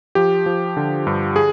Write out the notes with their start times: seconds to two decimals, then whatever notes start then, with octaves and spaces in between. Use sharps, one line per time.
0.15 F3 G4
0.46 F3
0.77 D3
1.07 G2
1.36 G#4